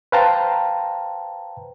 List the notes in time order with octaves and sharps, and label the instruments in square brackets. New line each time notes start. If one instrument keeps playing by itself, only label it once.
[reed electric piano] B4 C5 F5 G5 A5 A#5